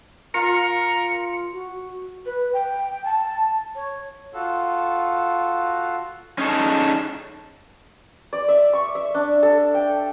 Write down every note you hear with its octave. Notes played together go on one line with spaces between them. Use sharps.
F4 A#4 C#7
F#4
B4
G5
A5
C#5
F4 F#4 A4
C#4 D#4 G#4 A4
D5
E5
C#6
E5
D4
A4
G5